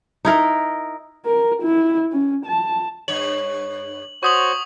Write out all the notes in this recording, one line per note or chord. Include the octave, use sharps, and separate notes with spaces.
D#4 E4 A#4
A#4
E4
C#4
A5
G2 C#5 F#7
F#4 C5 C#5 C#6 D#6 F#7